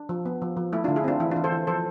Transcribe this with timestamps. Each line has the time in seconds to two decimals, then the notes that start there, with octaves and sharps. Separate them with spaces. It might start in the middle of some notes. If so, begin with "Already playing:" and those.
Already playing: D4
0.09 F3
0.26 B3
0.42 F3
0.57 F3
0.72 A3 E4
0.84 D3 D4 F4
0.96 E4 G#4
1.04 C4 D4 F4
1.20 E3 E4
1.31 E3 D4 F4
1.44 A4 C5
1.52 E3
1.67 F3 A4 C5